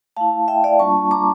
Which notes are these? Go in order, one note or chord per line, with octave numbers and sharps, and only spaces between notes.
A3 E4 F5 A5
E5 G5
D5 F5
G3 A#3 D4 F4 A5 C#6
A#5 D6